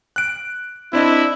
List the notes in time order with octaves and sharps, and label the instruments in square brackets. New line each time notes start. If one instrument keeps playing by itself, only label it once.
[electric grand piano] F#6 D7
[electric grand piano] C4 D4 D#5 [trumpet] E4